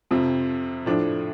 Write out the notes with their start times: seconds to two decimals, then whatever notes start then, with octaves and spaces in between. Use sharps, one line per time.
0.11 F2 C3 F3
0.86 A2 F3 D4